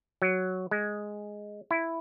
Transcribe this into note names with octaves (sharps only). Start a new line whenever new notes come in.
F#3
G#3
E4